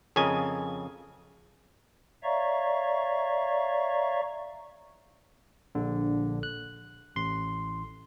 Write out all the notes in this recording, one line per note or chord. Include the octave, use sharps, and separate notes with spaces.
F2 C#3 A#4 D#5 G#5
C#5 D5 E5 F5 A#5 C#6
A#1 D3
F#6
A1 C6